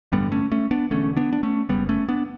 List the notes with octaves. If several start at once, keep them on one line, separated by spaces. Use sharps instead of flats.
A1 G2 D3 G3 B3
A3 C#4
A3 C#4
B3 D4
E1 E2 D3 A3 C#4
B3 D4
D4
A3 C#4
F#1 E2 C#3 G3 B3
A3 C#4
B3 D4